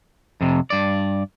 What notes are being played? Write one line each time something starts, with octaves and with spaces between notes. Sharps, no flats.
F2 C3
G2 D5